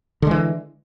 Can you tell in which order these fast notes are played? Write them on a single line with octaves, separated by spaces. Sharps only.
D3 G#3 E3